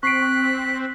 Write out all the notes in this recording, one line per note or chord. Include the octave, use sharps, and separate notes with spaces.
C4 C#6 F#6 B6 C7 D7